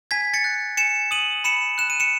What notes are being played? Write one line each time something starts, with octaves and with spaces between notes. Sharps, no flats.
G#5 G#6 B6
A6 C#7
F#6
G#5 C#7 E7
D#6 D#7 F#7
B5 C#7 E7
F#6 E7
D#7
C#7 E7